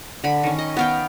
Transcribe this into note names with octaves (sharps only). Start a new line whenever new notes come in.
D3 B5
D#3 C#4
D#5
B3 F5 G5